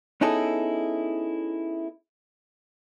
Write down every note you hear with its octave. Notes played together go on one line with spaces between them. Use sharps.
B3 C#4 D#4 E4 G#4 A4